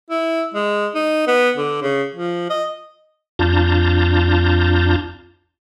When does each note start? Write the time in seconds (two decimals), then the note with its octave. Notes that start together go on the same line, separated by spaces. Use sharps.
0.10 E4
0.54 G#3
0.95 D#4
1.27 B3
1.57 D3
1.82 C#3
2.15 F3
2.50 D#5
3.39 F2 D4 F4 A5 A#5 G6